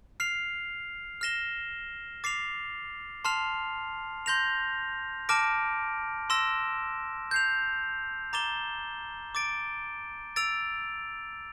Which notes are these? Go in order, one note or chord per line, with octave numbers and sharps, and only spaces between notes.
F6 C7 F7
F6 A#6 E7 G7
D6 A6 C7 F7
A5 C6 F6 C7 F7
C6 G6 A#6 F7
A5 D6 F6 A#6 D7
C6 E6 A#6 E7
G6 C7 F7
A#5 D6 A6 E7 G7
D6 A6 D7
E6 A6 D7 F7